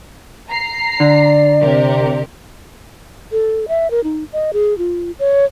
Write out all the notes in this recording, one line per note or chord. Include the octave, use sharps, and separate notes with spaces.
A#5 C7
D3 D5
C3 G4 A#4
A4
E5
A#4
D#4
D#5
G#4
F4
C#5